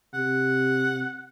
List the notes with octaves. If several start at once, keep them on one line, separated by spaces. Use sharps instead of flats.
C3 F#5